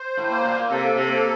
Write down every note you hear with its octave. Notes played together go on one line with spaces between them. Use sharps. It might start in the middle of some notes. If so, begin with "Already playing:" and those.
Already playing: C5
A2
A#3
A#2
C3 A4
C3
A#3